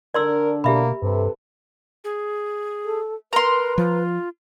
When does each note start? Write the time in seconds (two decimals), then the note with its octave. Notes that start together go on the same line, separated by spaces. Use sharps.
0.14 D3 D4 A#4 D5 C6 E6
0.64 B2 A#3 G4 E5 B5
1.02 G2 C3 A4 B4
2.04 G#4
2.85 A4
3.33 A#4 B4 A#5 C6
3.78 F3 F4